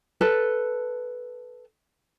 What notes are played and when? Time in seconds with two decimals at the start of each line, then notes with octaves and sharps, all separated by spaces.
0.21 A4 B4 A5